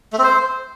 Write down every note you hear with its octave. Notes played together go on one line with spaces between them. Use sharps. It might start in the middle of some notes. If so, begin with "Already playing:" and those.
A3
C4
C5